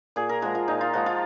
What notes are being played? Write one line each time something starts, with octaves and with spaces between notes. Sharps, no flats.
A#2 G#4
A#4
F3 G#3 F#4
F4
A#2 D#4
F4
F3 G#3 F#4
F4